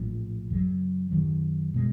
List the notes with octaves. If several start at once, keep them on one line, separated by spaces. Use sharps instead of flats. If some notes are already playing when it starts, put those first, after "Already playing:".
Already playing: A#1 A2 F3
F#2 C#3 F#3
F#2 D#3 F#3
B2 G#3